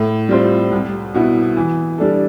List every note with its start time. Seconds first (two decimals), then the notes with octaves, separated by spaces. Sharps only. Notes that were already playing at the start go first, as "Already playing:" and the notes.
Already playing: A2
0.29 G3 C4 F4 C5
0.71 C2
1.14 B2 B3 E4
1.57 E3
1.98 G3 D4 A4